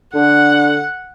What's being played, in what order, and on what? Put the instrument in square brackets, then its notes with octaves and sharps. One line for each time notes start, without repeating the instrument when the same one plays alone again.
[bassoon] D3 [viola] F#5